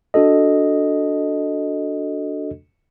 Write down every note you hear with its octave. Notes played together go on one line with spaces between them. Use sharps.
D4 F#4 A4 D#5